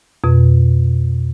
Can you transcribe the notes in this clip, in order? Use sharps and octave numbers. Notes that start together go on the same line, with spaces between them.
F2 B2